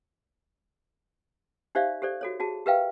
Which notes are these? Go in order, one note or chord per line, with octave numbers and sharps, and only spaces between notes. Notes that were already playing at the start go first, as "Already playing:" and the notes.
D#4 G4 C5 D5 E5 F5
G4 A4 C5 D5
F#4 A4 C#5
F#4 G#4 A5
G4 A#4 B4 E5 F5 G5